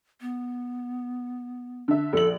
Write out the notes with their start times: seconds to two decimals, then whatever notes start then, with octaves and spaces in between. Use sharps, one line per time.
0.21 B3
1.88 D3 E5
2.13 A#1 A4 F#7